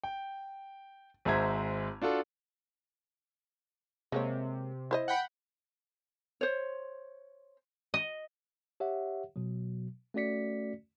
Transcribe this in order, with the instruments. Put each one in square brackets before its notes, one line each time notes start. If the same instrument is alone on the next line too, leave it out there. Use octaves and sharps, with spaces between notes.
[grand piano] G5
G#1 G#3 C5 E5 A#5 G#6
D4 F4 F#4 A4
[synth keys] C3 [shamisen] G#3 A#3 C#5
[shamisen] E4 C5 D#5
[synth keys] F#5 G5 B5
[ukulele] C5 C#5
[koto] D#5
[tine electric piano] G4 C#5 E5 F#5
B2 F#3
A3 C#4 F#4 D5 B6 C#7